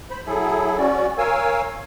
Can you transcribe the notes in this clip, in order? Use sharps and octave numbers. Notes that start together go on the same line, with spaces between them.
C5 B5
F#3 E4 G#4 A4
C#4 F#4 D5
A#4 C#5 F5 G#5 E6